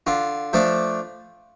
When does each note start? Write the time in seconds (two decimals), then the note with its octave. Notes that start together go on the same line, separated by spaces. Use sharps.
0.07 D3 F4
0.53 F3 A3 D4